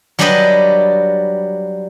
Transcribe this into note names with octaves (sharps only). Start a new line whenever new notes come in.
F#3 G3 D4 G4 B4 D#5